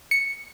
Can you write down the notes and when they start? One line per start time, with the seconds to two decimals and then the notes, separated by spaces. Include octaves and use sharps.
0.11 C#7